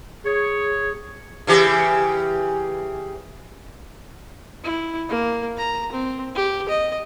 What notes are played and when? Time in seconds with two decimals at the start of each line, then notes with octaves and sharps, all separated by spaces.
0.25 G#4 C#5
1.47 C#3 E3 G4
4.64 E4
5.09 A#3
5.57 A#5
5.92 C4
6.35 G4
6.69 D#5